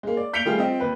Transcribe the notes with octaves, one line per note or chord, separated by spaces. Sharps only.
G#3 A#3
D5
G6 B6 C#7 D7 F7 G7
D#3 G3 A3 F4 G#4
C4 F4 D#5
D#2 B4